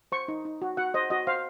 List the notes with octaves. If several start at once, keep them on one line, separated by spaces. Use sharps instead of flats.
C5 C#6
D#4
D#4
F#4
F#4 F#5
C5 D#5
F#4 D#5
C5 F5